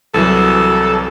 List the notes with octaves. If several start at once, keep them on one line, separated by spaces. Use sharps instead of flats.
C2 E3 F#3 A4